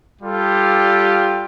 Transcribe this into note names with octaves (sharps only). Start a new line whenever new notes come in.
G3 F4 G4 A4